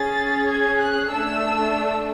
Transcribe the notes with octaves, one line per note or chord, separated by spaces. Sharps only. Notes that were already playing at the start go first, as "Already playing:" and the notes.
Already playing: C#4 G#4 A6
G#6
F#6
A3 D4 A4 E6